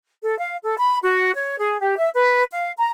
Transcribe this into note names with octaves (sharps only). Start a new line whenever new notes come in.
A4
F5
A4
B5
F#4
C#5
G#4
G4
E5
B4
F5
A#5